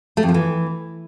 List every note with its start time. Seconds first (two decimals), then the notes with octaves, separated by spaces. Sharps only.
0.17 A3
0.23 F2
0.29 F3
0.34 E3